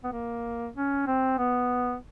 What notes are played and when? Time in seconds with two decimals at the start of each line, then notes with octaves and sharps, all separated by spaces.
0.04 B3
0.12 A#3
0.75 C#4
1.07 C4
1.38 B3